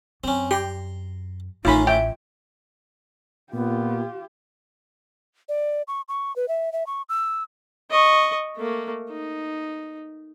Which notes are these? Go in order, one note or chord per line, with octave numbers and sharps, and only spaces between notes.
F#2 C4 C#4
G4 A#5 C6
A1 A2 D#3 C#4 D#4 F4 B5
E5 G5
A#2 B3 F4 G4
D5
C#6
C#6
B4
E5
E5
C#6
E6
D#5 C#6
A3 A#3
D#4